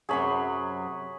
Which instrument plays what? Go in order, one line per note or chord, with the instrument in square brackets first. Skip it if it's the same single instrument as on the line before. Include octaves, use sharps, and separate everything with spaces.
[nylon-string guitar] F#2 C3 F#3 [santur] G#4 C#5 B5